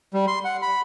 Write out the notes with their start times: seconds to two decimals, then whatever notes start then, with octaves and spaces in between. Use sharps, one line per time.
0.14 G3
0.28 C6
0.45 F#5
0.62 B5